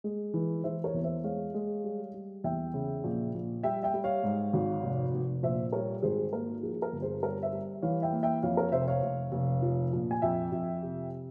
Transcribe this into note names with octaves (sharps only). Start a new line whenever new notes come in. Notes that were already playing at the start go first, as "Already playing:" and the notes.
G#3
E3
E3 C5 E5
A#4 C#5
E2
C5 E5
G#3 C#5 F5
G#3
G3
G3
E2 E5 G5
C#3
A#1
A#1
G3 E5 G5
E5 G5
G3
C#5 F5
G#2
G#1
F1
F1
A#1 C5 E5
G3 A#4 C#5
G#1 G#4 C5
A#3 A#4
F3 G#4
A#4
G1
G#4 C5
G3 A#4 C#5
C5 E5
G3
E3 C#5 F5
E5 G5
A#3
E5 G5
F2 C#5 F5
A#4 C#5
F1 C5 E5
C#5 F5
F1
F1
F3
A#1
G#5
F2 E5 G5
F2
C3